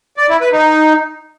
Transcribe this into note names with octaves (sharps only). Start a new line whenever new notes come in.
D5
E4
B4
D#4